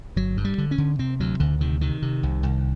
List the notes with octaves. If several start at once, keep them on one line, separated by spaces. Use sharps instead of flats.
G1 F#3
G2
G3
D3
C#4
D3
C3 C4
D2 F#3
D2 D3
C3 D#3
C3 D#3
C3
C2
C2